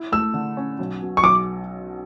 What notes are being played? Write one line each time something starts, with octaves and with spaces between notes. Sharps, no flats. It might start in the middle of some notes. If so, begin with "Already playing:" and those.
Already playing: E4
A3 E6
D3
C#4
B1
B2
C#6
B1 D6